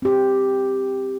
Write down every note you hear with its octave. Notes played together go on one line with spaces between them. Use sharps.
C4 G4